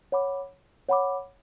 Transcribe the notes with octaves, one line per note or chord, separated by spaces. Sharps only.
C#5 F#5 B5 D6
C#5 F#5 B5 D6